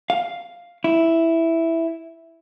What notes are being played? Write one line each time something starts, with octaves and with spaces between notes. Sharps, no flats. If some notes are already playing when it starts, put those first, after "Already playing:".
F5
E4